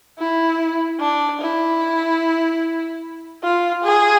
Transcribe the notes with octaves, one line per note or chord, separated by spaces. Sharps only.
E4
D4
E4
F4
G#4